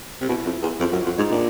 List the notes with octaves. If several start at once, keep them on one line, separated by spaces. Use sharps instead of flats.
C3
B2 E4
F2
E2
F2 F4
F#2 F#4
F2 F4
G#2 D#4
A#2 D4